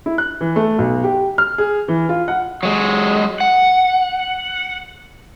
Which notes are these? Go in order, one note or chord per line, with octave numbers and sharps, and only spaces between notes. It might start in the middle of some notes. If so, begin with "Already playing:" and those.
E4
F#6
E3
A3
B1
G4
F6
G#4
E3
F4
F#5
F#3 G#3
F#5